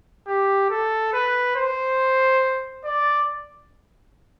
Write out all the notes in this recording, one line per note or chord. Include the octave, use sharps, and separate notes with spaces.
G4
A4
B4
C5
D5